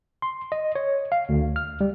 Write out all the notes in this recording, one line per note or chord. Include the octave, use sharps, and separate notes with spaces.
C6
D#5
C#5
F5
D2
F6
G3